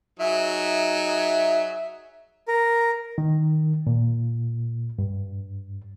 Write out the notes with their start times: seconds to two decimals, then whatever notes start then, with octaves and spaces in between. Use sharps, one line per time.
0.19 F#3 D#4 G#4 E5
2.48 A#4
3.18 D#3
3.87 A#2
4.99 G2